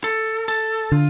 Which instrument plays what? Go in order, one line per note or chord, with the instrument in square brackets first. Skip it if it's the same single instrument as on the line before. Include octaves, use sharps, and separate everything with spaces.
[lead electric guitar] A4
A4
[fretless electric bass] D3 [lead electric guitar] F4